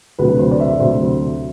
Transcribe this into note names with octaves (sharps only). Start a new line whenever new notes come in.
D2 C3 F#3 B4
C5
D5
E5
D2 C3 F#3 C5